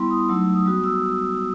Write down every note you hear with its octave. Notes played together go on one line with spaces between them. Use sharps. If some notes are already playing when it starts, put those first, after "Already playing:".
Already playing: G3 B3 E4 C6
D#6
F#3 A3 D#4 E6
D#6
G3 B3 F#4 D#6
E6